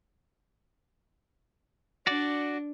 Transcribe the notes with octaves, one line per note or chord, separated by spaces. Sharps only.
D4 F#4 D5